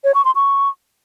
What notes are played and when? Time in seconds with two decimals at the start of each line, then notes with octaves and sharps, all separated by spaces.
0.04 C#5
0.14 C#6
0.25 C6
0.35 C#6